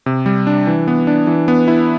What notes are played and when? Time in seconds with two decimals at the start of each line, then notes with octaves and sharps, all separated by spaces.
0.06 C3
0.26 G3
0.47 D4
0.67 E3
0.88 B3
1.07 D4
1.27 E3
1.48 B3
1.68 E4